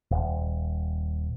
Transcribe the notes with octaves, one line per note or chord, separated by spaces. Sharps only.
D#1